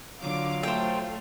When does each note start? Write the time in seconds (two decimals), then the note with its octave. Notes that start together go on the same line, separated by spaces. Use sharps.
0.22 D3 F#3 F4 F5 D6
0.63 A3 C5 G5